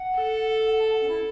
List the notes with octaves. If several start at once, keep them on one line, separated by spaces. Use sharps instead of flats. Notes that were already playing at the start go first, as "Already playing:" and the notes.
Already playing: F#5
A4
F#5
A5
F#5
C#4
E4